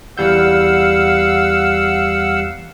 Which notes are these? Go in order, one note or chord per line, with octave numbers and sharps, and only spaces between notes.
E2 G3 F5 F#5 E6 G6